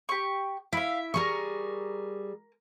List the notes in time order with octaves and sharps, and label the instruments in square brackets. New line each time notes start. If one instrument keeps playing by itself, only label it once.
[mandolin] G4 C#6
[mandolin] E4 E5 [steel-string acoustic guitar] F5
[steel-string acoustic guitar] G3 G#4 [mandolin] A#4 C#6